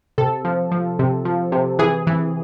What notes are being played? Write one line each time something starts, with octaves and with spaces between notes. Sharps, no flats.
C3 A4
F3
F3
C3
F3
C3
E3 G#4
E3